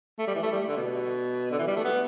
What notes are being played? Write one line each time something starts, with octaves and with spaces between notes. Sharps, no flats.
A3
G3
E3
A3
G3
D3
B2
D3
E3
G3
A3
B3